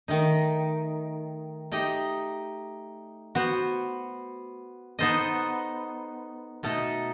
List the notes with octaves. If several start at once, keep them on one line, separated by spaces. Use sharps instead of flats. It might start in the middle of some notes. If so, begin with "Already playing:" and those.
D#3 A3 D#4
A3 D#4 G4 D#5
B3 F#4 C5
B3 D#4 A4 C5 D#5
B2 A3 D#4 A4